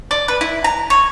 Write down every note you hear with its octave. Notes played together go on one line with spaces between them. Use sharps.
D5
B4
E4
A#5
C#5